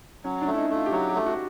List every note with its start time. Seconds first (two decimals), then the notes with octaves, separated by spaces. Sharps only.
0.24 F#3 C#4
0.42 D4
0.47 A3
0.53 E4
0.58 D#4
0.70 A3
0.75 F4
0.86 G4
0.92 F#3 F#4
1.09 G4
1.15 A3
1.26 F#4